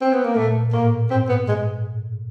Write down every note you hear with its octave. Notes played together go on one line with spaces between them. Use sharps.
C4
B3
A#3
A#2 A3
A2 A#3
G#2 C4
B3
G#3